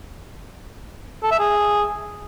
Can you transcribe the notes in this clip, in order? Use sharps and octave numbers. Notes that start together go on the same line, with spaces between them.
A4
E5
G#4